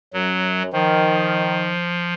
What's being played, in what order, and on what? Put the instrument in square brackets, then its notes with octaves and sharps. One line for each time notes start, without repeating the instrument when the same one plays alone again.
[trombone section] F#2 [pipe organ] F#3
[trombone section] D#3 [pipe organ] F3